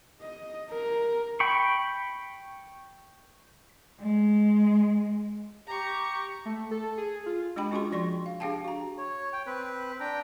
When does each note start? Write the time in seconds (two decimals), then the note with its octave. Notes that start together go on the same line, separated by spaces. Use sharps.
0.21 D#5
0.70 A#4
1.40 G5 B5 C#6
4.00 G#3
5.67 G4 A#5 C#6
6.45 A3
6.71 A4
6.97 G#4
7.26 F4
7.56 G#3 D4 G4 D#5 G5 B5
7.71 C#4 F4 F#4 G#4 G5 C6
7.92 F3 D5 C6 C#6
8.26 F5
8.40 D4 G4 G#4 F5 G5 A5
8.64 F#4 A#5
8.98 C#5
9.33 G5
9.47 C4 B4
10.00 D4 G5 A#5